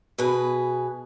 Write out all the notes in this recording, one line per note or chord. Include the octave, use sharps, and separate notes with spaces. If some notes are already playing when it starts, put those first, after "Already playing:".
B2 G#4 B4